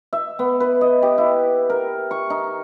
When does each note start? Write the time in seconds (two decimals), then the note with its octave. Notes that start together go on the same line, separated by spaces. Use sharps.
0.13 E5
0.39 B3
0.60 B4
0.81 D#5
1.02 G4
1.18 E4
1.70 A#4
2.11 C#6
2.30 D#4